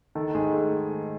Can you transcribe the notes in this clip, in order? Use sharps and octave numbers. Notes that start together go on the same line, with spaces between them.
D#3 A4
G#2 G#4
A3 A4